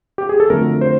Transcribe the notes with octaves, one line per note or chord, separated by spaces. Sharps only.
G4
G#4
A4
F2 D3 F#3 A3 A#4
C5